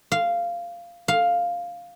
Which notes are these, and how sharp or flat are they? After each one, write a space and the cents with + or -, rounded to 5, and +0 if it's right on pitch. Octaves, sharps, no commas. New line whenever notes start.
F5 -10
F5 +5